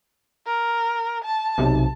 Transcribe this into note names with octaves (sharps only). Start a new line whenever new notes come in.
A#4
A5
B1 C3